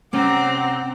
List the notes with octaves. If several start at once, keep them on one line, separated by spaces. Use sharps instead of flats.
C3 C4 C#4 F#5 A#5 D6